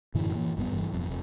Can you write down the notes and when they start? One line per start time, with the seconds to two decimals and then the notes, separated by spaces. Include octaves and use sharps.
0.14 F#2 A2 D3 E3
0.34 E3 A#3
0.57 F1 G2 A#2 B3
0.71 G1 G2 E3
0.92 E1 F2
1.08 F1